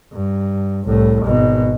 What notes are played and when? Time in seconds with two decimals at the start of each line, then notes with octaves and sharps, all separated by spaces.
0.12 G2
0.85 C2 A2
1.24 G#1 B2